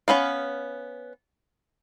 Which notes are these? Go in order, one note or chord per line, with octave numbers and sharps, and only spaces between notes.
B3 C#4 B4 F5